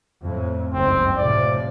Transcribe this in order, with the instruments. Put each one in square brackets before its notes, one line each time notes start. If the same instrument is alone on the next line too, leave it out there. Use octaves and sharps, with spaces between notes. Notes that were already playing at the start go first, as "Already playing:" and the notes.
[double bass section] F2 A2
[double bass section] F#1 C#2 G#2 [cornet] C4
[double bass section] A2 C3 F3 [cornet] D5